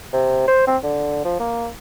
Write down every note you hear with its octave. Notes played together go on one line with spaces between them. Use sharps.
C3
C5
C4
D3
F3
A#3